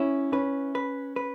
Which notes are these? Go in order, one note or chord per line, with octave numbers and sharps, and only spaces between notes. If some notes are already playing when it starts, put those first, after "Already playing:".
Already playing: C#4 E4
C#4 B4
B4
B4